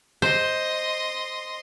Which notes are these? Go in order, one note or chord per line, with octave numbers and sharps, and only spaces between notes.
C5 D#5 C6